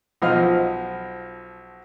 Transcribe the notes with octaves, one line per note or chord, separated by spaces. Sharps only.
B1 F3 D#5 F5 F6